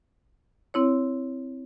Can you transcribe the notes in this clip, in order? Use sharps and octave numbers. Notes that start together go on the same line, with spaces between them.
C4 E4 C#5